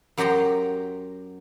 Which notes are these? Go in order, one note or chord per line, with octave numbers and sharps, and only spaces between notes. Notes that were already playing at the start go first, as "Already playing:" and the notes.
F#2 F#3 G4 G5 A#5 C6